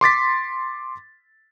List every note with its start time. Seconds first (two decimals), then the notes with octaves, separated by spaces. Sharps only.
0.01 C6 D6 A6 B6